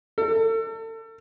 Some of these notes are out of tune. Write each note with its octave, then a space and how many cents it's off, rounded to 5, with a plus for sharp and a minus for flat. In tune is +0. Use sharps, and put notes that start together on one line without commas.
A4 +35